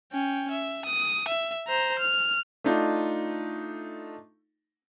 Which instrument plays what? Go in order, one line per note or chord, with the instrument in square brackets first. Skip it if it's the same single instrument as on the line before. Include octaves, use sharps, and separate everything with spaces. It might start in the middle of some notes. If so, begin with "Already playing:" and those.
[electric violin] C#4 G5
E5
D#6
E5
C5 A#5
F6
[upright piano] A3 D4 D#4 F4